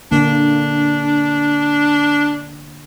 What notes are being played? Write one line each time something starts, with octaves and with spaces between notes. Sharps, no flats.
D3 A#3 D4